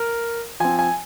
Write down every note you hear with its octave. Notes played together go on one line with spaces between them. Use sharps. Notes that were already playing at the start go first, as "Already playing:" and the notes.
Already playing: A#4
F3 C4 G#5
G#5